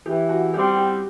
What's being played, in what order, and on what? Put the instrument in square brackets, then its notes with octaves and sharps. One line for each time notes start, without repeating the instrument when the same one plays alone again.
[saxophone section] E3 [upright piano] G4
[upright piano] F#4
[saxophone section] G3 C4 [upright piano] G4
[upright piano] G4